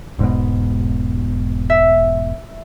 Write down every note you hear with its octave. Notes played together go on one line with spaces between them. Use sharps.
E1 G#2 B2
E5